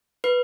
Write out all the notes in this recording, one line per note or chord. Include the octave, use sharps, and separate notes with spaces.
B4